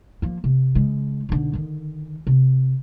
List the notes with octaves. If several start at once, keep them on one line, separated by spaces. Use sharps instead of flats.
F3 A#3
C3
C#3 G#3
B1 D3
D3 D#3
C3